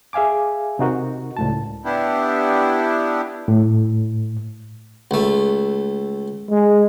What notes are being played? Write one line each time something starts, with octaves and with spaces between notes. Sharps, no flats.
G#4 E5 F5 G#5 D6
C3 D#4 F#4 A#4
C#2 A2 A5
B3 D4 E4 G4
A2
C#2 A3
G#3